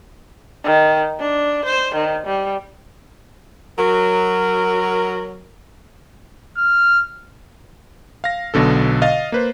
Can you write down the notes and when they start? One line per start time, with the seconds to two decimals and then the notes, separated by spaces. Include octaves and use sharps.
0.65 D#3
1.20 D4
1.65 C5
1.95 D#3
2.26 G3
3.78 F#3 A#4
6.58 F6
8.24 F5 A#6
8.54 B1 B2 D3 A4
9.02 D#5 F5 A6
9.32 A#3 B4 C5